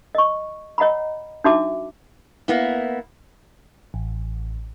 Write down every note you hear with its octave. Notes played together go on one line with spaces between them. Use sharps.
D#5 C#6
C#5 D#5 F#5 A#5 B5
D4 D#4 F#4 E5 A5 D6
A#3 B3 E4
A1